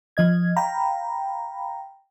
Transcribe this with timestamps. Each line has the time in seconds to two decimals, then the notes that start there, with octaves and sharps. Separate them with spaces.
0.17 F3 D#5 G#6
0.56 F5 G5 A#5 B5